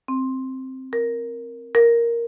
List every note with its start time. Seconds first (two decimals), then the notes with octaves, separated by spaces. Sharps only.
0.08 C4
0.93 A#4
1.75 A#4